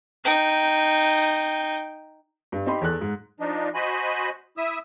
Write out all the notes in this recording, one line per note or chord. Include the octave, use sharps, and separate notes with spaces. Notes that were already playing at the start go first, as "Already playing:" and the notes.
D#4 G5
G2
C4 D#4 G4 D#5 B5 C6
E2 A4 F#6
G#2
F3 D4 D#4
F#4 C5 D#5 G#5 B5
E4 E5 D#6 E6